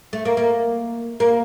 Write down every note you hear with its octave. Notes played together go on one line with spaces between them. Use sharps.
A3
A#3
A#3
A#3